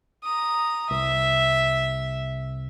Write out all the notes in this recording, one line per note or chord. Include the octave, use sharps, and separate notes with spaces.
A#5 D#6
C2 E5